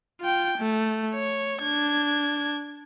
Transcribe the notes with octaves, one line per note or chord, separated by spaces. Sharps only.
F4 G5
A3
C#5
D4 G#6